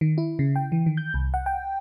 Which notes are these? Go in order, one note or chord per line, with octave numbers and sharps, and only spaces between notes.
D#3
E4
C#3
G5
E3
D#3
G6
C2
F#5
G5